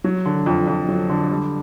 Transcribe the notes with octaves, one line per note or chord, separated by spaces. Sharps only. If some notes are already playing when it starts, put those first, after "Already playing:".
F#3
D3
F2
F2
F#3
D3
G3